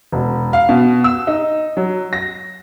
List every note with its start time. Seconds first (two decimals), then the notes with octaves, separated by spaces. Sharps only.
0.12 E1
0.53 F5
0.69 B2
1.04 E6
1.27 D#4
1.77 F#3
2.13 A#6